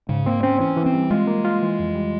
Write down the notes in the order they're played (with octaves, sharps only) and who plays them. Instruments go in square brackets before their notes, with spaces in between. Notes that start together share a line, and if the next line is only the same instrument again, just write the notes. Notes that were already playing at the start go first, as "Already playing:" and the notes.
[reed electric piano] G#2 [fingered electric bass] C#3
[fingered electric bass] A#3 [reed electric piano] C4
[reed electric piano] C4 [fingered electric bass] C#4
[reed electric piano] E3 [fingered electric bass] C#4
[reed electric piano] E3
[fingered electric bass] C4
[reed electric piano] G3
[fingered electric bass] G#3 [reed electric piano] F4
[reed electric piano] A#3
F4
E3
F2
G3